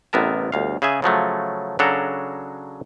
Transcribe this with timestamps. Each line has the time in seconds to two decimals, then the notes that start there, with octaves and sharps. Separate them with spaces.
0.13 A1 C3 B3 A#4 A5
0.52 G1 D2 F5
0.82 C#3 G#4 E5 G#5
1.02 C#3 F3 F#3 A3
1.79 C#3 F#3 D4 F#4 A4 A#5